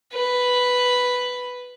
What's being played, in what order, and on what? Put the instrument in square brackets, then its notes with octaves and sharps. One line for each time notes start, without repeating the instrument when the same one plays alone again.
[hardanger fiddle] B4